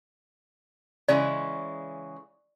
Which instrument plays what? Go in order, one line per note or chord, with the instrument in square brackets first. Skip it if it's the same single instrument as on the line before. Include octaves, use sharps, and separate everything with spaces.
[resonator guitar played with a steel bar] C#3 E3 G#3 [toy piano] D5